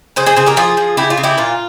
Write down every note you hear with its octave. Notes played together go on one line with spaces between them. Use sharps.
C#3 G#4 C5
G#4 C5
C#3 G#4 C5
G4 A#4
F3 F4 G#4
F3
C#3 E4 G4
F4
C#3
E4 G4
A#2 F4